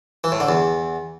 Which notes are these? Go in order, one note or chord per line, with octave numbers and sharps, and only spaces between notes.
E3
A2
D3
E2